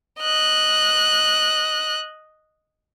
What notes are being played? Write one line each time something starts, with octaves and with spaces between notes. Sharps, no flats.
D#5 F#6